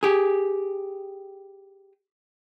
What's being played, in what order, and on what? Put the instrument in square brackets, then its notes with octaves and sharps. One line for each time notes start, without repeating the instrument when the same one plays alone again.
[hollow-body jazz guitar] G4 G#4